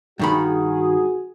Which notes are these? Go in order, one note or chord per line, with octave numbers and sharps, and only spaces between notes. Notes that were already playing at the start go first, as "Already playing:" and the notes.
G2 D#3 F#4 G#4 B5